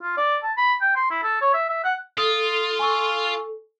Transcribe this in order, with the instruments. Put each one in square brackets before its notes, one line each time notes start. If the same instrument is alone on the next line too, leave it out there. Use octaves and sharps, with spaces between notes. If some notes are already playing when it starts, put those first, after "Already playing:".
[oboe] F4
D5
A5
B5
G5
C6
E4
A4
C#5
E5
E5
F#5
[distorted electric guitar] F4 [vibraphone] A4 [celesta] D#6
[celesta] G#5 C#6 E6